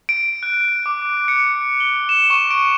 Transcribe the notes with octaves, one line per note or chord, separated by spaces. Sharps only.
D7
F#6
D6
C#7
G7
E7
C#6
D7